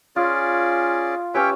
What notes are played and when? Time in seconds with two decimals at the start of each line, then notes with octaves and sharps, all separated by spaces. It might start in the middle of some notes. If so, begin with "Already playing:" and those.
0.16 C#4 F4 G#4 D5
1.34 C#4 G4 B4 C#5 E5 G5